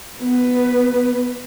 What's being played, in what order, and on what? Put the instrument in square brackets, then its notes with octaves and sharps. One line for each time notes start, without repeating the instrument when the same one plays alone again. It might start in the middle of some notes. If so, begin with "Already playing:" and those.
[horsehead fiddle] B3 B4